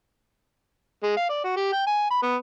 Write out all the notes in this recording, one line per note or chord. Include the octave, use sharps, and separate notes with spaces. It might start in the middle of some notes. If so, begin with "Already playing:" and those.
G#3
F5
D5
F#4
G4
G5
G#5
B5
B3